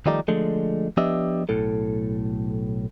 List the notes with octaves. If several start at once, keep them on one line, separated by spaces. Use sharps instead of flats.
D#3 F3 G3 A3 D#4 D5
D3 F3 G#3 A3
F3 B3 D4 G4 D#5 E5
B1 A2 A4